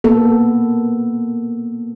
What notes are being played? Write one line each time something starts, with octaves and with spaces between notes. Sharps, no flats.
A#3 B3 A4